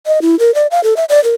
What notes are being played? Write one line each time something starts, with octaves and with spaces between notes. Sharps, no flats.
D#5
E4
A#4
D5
F5
A4
E5
D5
A#4